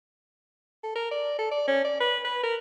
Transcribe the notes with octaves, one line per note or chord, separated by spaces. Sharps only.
A4
A#4
D5
A4
D5
C#4
D5
B4
B4
A#4